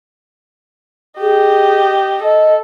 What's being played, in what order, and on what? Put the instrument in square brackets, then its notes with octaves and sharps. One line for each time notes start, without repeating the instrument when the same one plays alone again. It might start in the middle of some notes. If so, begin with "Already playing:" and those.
[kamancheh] G4 D#5 [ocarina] G#4
[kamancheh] A4 [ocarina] D#5